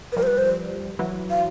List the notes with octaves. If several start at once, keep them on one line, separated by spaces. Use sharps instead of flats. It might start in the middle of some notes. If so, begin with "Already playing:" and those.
B4
F3 G3 A#4
C5
B4
C5
E3 F#3
F5